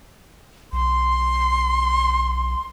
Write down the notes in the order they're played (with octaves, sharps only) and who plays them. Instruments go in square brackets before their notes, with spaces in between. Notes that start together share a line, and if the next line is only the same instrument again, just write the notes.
[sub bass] B1 [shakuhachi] C6